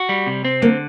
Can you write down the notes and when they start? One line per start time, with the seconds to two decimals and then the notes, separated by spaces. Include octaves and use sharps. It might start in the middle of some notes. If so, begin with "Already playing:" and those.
Already playing: F#4
0.09 G3
0.27 C3
0.45 C4
0.62 D3 A#3